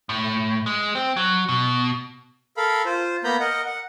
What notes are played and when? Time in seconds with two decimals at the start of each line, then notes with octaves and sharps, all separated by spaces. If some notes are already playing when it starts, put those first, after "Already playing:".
0.09 A2
0.66 G#3
0.95 C4
1.17 F#3
1.49 B2
2.57 A4 A#4 F5 B5
2.85 F4 C5
3.24 A#3 B3 A#5 B5 G6
3.40 A#4 D#5 F#5
3.66 F#5